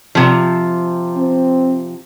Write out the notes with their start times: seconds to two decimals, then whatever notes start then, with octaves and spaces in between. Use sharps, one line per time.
0.15 C3 F3
1.17 C4